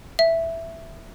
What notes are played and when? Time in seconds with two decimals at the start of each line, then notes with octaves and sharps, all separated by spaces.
0.19 E5